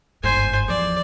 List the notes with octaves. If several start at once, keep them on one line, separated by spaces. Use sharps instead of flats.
G1 G#2 C5 G#5
E2 F3 D5